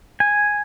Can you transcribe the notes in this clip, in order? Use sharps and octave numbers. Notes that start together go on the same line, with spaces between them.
G#5